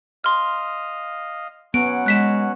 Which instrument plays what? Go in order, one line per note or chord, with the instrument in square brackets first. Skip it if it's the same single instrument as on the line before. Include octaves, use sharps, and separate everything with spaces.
[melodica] D#5 F5 [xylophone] C6 F6
[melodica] F#3 C#4 F#5 [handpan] B3 [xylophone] D7
[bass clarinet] G#3 [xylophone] F#6 B6 E7